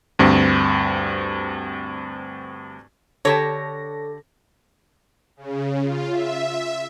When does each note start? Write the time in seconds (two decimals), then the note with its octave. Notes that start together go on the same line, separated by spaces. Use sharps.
0.19 D2 G2 C4
3.25 D3 G4 A4 C#5 A5 A#6
5.37 C#3
5.83 F4
6.11 E5